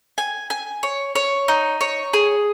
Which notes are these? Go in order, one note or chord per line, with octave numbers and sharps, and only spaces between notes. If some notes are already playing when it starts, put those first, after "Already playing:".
G#5
G#5
C#5
C#5
D#4
C#5
G#4